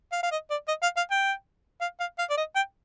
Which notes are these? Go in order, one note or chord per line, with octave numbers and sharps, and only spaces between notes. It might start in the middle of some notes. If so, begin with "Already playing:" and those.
F5
F5
D#5
D5
D#5
F5
F5
G5
F5
F5
F5
D5
D#5
G5